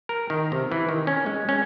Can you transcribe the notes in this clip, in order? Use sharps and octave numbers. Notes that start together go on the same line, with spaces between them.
A#4
D#3
C3
E3
D#3
C#4
G#3
C#4